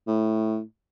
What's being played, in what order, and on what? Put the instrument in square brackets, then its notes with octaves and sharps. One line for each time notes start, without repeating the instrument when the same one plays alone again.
[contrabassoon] A2